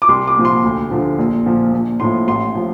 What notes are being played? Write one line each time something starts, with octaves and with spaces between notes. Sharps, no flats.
D6
C2 C6
D6
A#2 F3
C6
D2
D3 F3
A#1
A#2 F3
A#1
A2 F3 C6
A1 C6
F3